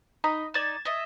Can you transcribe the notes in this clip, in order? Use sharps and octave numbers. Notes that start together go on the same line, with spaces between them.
D#4 D#5 B5
D#4 D5 G#6 A6 E7
D#5 E5